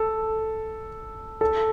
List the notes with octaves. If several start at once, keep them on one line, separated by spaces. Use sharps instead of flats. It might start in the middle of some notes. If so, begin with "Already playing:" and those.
Already playing: A4
A4